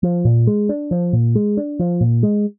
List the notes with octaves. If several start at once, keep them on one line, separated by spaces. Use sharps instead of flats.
F3
A#2
G#3
D4
F3
A#2
G#3
D4
F3
A#2
G#3